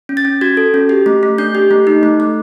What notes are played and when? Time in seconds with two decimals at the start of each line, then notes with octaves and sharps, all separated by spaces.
0.09 C#4
0.17 A6
0.25 C#4
0.41 F#4 G#6
0.57 A4
0.74 C#4
0.89 G4
1.06 A3
1.23 A3
1.38 D4 G6
1.55 G4
1.71 A3
1.87 D#4
2.03 A3
2.20 A3